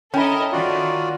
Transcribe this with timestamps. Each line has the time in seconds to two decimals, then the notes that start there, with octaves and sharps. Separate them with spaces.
0.14 C#4 E4 A4 A#4 D#5 G5 A5 B5
0.52 D#3 F4 F#4 D5